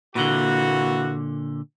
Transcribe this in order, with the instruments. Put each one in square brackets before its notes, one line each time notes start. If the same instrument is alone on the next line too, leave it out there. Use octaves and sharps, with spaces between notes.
[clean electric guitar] A#2 D3 [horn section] E3 A#3 F#4